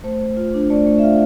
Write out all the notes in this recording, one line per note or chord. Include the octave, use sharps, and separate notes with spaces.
A3 C5
A3
F4
D4
A3 D5
A3
E5
F4 F5